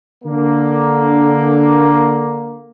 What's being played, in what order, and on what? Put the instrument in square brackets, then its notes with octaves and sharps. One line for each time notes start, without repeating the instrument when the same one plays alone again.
[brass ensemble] D3 A#3